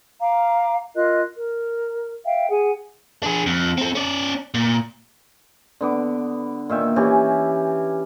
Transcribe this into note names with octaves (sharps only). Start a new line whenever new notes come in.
F5 A#5 D6
F4 A#4 D#5 F#6
A#4
E5 F5 G5
G#4 F#5 G#5
D4 G#4
F2
C4 A4
C#4 D5
A#2
D3 B3 D6
A#2 D#3 E5 G5
E3 C#4 G4 G#5